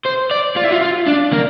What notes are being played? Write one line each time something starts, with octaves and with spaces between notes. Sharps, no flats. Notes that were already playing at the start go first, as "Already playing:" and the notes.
C5
D5
F4
E4
F4
F4
D4
A#3